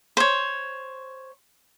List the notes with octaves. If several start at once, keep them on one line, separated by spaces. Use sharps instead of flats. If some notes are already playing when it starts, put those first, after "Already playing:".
C5 C#5